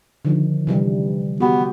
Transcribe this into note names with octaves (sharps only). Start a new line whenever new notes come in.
D3 D#3 F3
C3 E3 G3
B3 F#4 G4